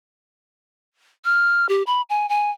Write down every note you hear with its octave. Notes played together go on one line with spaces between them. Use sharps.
F6
G4
B5
G#5
G#5